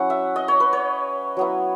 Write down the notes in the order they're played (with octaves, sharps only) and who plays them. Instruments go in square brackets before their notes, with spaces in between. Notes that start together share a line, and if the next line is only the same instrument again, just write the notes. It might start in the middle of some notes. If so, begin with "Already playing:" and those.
Already playing: [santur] F#3 C#4 E4 F#5
E5
D#5
C#5
B4
C#5
F#3 B3 E4